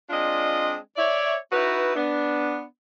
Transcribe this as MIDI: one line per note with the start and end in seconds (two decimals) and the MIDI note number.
0.10 0.75 56
0.10 0.75 60
0.10 0.75 62
0.10 0.75 65
0.10 0.75 74
0.10 0.75 75
0.97 1.35 73
0.97 1.35 74
0.97 1.35 76
1.52 1.94 63
1.52 1.94 64
1.52 1.94 66
1.52 1.94 71
1.95 2.62 59
1.95 2.62 62